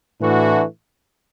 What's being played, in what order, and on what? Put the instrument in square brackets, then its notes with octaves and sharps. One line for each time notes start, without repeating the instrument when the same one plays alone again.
[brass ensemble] A2 E3 A3 D4 F#4